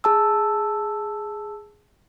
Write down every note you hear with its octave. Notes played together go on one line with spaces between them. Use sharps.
G#4 A5 E6